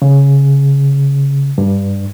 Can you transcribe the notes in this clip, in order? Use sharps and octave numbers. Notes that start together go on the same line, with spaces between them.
C#3
G2